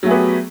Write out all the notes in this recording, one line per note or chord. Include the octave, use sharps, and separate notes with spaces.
F#3 A3 B3 G4 G#4